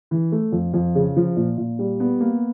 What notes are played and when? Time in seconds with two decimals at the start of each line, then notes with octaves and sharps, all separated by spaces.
0.11 E3
0.32 A3
0.52 F2
0.74 F2
0.95 C#3
1.16 F3
1.37 A#2
1.58 A#2
1.79 G3
2.00 B3
2.20 A#3